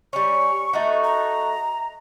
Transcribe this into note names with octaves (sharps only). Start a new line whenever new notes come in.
G3 C#4 C#6
A3 D#4 F#4
A#5